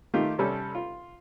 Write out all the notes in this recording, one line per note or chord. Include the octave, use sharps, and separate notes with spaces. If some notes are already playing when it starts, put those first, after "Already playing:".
D#3 A3 F4 G4
C3 G3 C#4 A4
F4